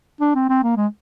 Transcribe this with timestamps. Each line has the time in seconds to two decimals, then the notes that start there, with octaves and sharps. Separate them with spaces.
0.21 D4
0.35 C4
0.49 C4
0.63 A#3
0.77 G#3